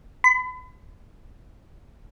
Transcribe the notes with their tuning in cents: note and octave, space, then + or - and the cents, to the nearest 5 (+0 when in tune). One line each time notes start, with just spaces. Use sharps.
B5 +35